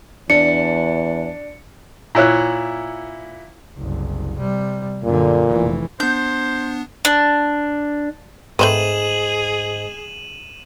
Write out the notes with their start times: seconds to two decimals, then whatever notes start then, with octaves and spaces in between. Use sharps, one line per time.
0.30 E2 D4 C#7
2.15 A#2 E4 C#5 F#6
3.78 F#1 C2
4.39 C3 G3
5.04 F#2 A#2 D3
5.48 F1 E3
6.00 B3 D4 C5 G6
7.05 D4
8.59 G#2 A3 C4 G#4 B4 D#7 E7 F#7